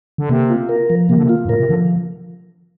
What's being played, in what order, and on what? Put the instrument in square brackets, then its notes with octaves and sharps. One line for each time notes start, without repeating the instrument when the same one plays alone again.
[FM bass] D3
[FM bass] C3 [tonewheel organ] A#3
[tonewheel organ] F4
A#4
F3
[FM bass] C3 [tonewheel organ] A#3
[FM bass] D3
C3
[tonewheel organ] F4
[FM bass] G2
[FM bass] A2 [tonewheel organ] A#4
[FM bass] C3
[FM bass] D3 [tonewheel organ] F3